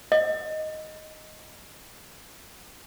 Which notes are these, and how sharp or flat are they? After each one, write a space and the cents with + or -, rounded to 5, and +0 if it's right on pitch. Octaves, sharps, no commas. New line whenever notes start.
D#5 +0